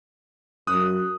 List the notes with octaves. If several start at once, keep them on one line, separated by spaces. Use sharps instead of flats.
F#2 D#6 F#6